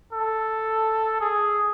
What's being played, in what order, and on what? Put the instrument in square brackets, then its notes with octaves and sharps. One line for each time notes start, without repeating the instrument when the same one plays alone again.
[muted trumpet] A4
G#4